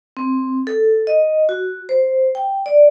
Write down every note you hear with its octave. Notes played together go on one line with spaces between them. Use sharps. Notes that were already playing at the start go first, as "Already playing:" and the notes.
C4
A4
D#5
F#4
C5
G5
D5